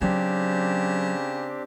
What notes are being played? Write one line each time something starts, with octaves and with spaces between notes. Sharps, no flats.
C#3 F#3 C4 D4 G4